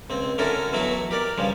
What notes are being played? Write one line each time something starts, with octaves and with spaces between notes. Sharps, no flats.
C#2 C4
D3 C#4 E4 F#4 A4 A#4
B2 E3 F#3 A3 E4 F#4
G4 A#4 D5
G2 C#3 F3 G3